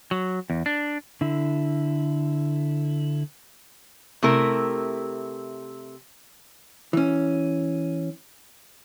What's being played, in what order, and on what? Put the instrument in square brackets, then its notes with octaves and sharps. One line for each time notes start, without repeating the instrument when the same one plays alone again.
[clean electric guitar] F#3
E2
D4
[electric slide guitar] D3 E4
[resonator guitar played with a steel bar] C3 A3 E4 A#4
[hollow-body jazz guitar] E3 C#4